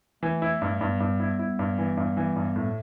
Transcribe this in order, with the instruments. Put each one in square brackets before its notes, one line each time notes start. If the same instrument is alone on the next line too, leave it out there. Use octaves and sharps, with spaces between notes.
[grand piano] E3 [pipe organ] A3
[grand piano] E4
G2
[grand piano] G2 [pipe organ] G3 B3
[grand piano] G2
E4
E4
G2
E3
G2
E3
G2
A2